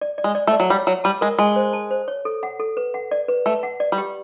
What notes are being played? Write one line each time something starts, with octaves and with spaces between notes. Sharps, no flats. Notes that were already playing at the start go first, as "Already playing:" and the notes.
D5
D5
G#3
D5
A3
D5
F#3
G3 C#5
F#3 C#5
G3 A5
G#3 A#4
G#3 A5
C5
A5
C5
C#5
A4
F#5
A4
B4
F#5
D5
B4
A3 B4
F#5
D5
G3
G4